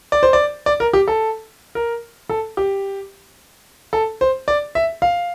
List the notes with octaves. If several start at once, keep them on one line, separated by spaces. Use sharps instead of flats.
D5
C5
D5
D5
A#4
G4
A4
A#4
A4
G4
A4
C5
D5
E5
F5